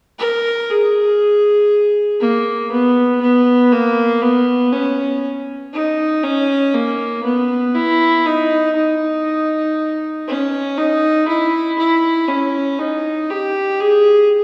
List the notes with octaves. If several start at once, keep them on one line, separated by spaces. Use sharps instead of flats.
A#4
G#4
A#3
B3
B3
A#3
B3
C#4
D#4
C#4
A#3
B3
E4
D#4
D#4
C#4
D#4
E4
E4
C#4
D#4
G4
G#4